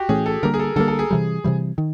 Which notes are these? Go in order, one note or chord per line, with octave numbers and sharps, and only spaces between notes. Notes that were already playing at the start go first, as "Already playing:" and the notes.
Already playing: F#4 G4
A2 E3 A3 C#4 G#4
A4
D3 G3 A#3 A#4
G#4
A4
D3 G3 A#3 A4
A4
G#4
C3 E3 G3
C3 E3 G3
D#3